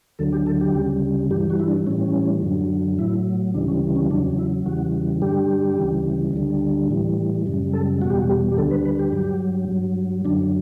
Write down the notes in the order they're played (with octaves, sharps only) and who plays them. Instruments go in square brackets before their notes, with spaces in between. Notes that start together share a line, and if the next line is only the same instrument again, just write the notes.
[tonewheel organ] D2 D3 F#3 A4
G4
A4
G4
D2 C#3 G3
G2 E3 G3 G4
F#4
E4
D4
A2 E3 G3 C#4
C#4
F#2 D3 F#3
A2 F#3 E4
D2 C#3 E3 G3 D4
C#4
C#4
E2 C#3 F#3 D4
E4
E2 C#3 E3 G3 F#4
G2 D3 G3 G4
D2 C#3 E3 G3
D2 D3 G3
A2 E3 G3
F#2 C#3 G3
A4
E2 B2 G3 F#4
G4
F#4
G4
G4
D2 D3 G3 A4
B4
B4
G4
G2 F#3
G2 F#3
F#2 D3 F#3 D4